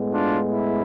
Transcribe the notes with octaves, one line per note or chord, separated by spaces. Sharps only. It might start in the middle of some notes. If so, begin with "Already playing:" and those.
Already playing: A2 G#3 B3
D4 F4
E4